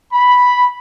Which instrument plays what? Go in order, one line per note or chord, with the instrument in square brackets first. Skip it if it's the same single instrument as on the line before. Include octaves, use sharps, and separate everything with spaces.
[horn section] B5